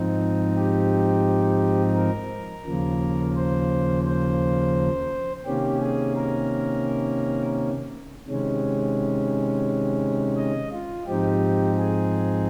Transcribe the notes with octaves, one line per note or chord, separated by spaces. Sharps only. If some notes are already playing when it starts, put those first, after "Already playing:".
Already playing: G#2 F3 C4 D#4
G4
A#4
D#2 C#3 F3 A#3
C5
C5
C3 D#3 A#3 C#4 G4
G#4
A#4
C3 D#3 G#3 C#4
D#5
F4
G#2 F3 C4 D#4 G4
G#4